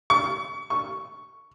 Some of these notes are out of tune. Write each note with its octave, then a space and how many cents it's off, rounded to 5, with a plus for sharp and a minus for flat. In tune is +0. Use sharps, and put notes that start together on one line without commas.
C#6 +35
C#6 +5